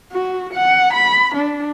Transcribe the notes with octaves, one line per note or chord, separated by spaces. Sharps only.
F#4
F#5
B5
D4